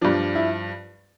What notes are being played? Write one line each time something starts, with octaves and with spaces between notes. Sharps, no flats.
G2 F3 D4
E4